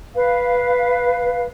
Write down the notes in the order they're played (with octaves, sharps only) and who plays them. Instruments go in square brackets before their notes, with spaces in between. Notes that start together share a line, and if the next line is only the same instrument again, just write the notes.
[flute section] B4 F5